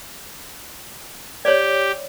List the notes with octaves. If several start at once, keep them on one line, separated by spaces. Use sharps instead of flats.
G4 C#5 D5